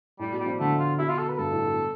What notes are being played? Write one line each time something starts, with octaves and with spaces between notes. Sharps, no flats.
A2 G3
B2
G3
F3
D3 A3
F4
B2 E4
F4
A4
B4
G2 A4
A2
B2